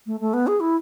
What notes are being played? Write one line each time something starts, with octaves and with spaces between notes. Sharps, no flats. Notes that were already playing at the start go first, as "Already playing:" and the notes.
A3
A3
B3
G#4
E4